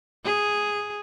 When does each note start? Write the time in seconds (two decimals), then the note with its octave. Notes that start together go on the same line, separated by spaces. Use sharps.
0.25 G#4